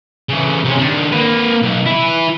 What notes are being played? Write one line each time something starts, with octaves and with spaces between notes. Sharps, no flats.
C#3 E3
C3 C#4
D#3 D4
A#3 B4
B1
E4 B4